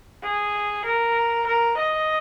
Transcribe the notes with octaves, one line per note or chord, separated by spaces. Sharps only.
G#4
A#4
A#4
D#5